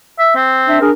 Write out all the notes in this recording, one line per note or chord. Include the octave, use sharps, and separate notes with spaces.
E5
C4
D4 E5
D4 G#4 A#4